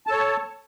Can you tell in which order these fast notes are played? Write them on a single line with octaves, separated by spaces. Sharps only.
A5 A4 C#5